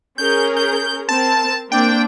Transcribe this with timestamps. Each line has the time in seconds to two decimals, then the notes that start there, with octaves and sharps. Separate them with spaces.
0.18 C#4 G#4 A#4 G6
0.57 G6
1.09 C4 A#4 A5
1.72 A#3 C4 D4 G5